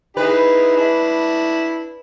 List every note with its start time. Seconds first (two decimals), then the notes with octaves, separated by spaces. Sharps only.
0.17 D#4 E4 G#4 B4
0.77 D4 E4